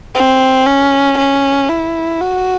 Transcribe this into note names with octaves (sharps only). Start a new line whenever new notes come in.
C4
C#4
C#4
E4
F#4